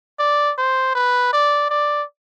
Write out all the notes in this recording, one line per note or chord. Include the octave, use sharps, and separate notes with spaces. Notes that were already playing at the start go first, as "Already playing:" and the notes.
D5
C5
B4
D5
D5